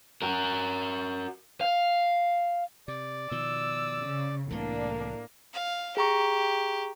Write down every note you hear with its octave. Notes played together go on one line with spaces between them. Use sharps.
F#4 A#4
F5
C3 D5
B2 D#3 F3 E6
C#3
C2 A2 E3 A3 A#3 D4
F5
G4 G#4 A#5 C#6